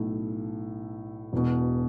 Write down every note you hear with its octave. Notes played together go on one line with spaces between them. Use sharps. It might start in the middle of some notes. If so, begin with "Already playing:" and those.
Already playing: B1 A2 A3
E1 E2 B2